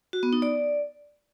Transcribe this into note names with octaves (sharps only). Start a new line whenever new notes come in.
F#4
B3
D#4
D5